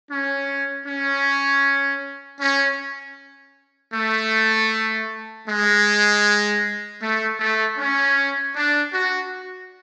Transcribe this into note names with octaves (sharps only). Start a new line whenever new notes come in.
C#4
C#4
C#4
A3
G#3
A3
A3
C#4
D4
F#4